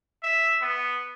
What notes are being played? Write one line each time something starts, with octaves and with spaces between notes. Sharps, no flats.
E5
B3